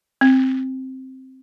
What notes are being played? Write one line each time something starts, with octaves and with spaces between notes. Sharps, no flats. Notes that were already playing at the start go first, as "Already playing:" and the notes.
C4